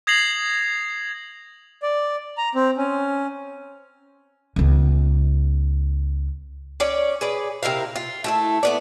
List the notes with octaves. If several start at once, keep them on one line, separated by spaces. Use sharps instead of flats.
D#6 G#6 A#6 C7 F7 F#7
D5
A#5
C4
C#4
C#2 B3
C#4 C#5 D5
G#4 B4 D5
C3 E4 A#4 F5
F4
A3 E4 E5
A3 B3 D5